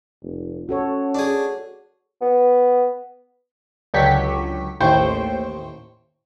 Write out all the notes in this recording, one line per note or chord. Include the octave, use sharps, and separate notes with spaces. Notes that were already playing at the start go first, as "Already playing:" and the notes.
F1
C#4 F#4 A4 C#5
D4 G#4
B3
C#2 D3 F#3 G4 C#6 B6
A1 D#2 A2 C5 G5 C#6